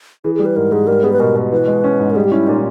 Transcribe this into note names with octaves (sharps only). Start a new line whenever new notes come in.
E3 G#4
G3 G#4
B4
G#2 A#4
G#2 G#4
G3 A#4
B3 G#4
B4
B2 A#4
B2
E3 B4
G#3
C#4
G#2
A#4
G3 G#4
G4
C#4 E4
A#2 D#4